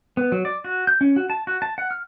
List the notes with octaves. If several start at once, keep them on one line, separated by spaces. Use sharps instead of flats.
B3
F#3
D5
F#4
G6
C#4
F#4
A5
F#4
A5
F#5
F6